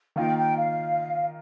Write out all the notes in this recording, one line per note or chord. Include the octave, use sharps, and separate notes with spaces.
D#3 A#3 F4 G5
G5
F5